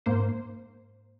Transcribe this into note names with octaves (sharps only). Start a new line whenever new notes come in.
G#2 A#3 C5